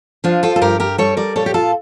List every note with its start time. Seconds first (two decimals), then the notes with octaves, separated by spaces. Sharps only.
0.24 F3 D4 F4
0.43 F4 A4
0.56 A4
0.61 G2 G4 A#4
0.80 G4 A#4
0.98 G3 A4 C#5
1.17 A#4 D5
1.36 A#2 A4 C#5
1.46 G4
1.54 F4 A4